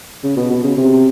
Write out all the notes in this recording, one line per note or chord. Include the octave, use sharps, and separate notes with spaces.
C#3
B2
B2
C#3
C3